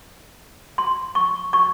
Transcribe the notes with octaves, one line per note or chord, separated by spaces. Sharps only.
C6
C#6
C#6